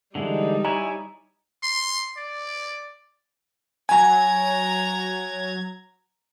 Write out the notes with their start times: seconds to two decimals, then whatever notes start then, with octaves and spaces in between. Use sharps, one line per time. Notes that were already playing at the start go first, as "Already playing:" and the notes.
0.15 D3 E3 G3 G#3 D#4
0.65 E4 C#5 G#5 A#5
1.63 C6
2.17 D5
3.89 F#3 G#5 A#5 G#6